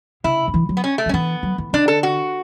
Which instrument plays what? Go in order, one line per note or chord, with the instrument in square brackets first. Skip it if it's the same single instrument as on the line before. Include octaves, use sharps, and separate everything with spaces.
[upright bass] C#3 [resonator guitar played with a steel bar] E4
[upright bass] D3
E3
F#3
[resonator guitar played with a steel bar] B3
C#4
A3
[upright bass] F#3
[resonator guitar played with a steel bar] C#4
[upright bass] E3 [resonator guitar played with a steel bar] B3
[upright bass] F#3
E3
[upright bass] D3 [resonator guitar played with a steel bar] D4
[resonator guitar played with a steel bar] A4
F#4